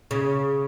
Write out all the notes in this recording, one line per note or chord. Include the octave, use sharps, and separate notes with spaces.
C#3